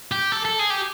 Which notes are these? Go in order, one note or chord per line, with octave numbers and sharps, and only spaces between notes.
G4
A4
A4
G#4
G4